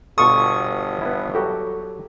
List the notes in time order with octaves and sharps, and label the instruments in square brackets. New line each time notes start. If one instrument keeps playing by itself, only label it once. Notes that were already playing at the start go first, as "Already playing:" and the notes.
[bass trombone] G1 [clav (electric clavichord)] B2 F4 A4 [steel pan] C#6 [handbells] D#6
[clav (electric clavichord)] B3 E4
[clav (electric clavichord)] F#3 F#4 G4 [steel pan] A4